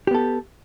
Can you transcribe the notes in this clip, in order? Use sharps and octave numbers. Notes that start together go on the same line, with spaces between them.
B3 G4 A4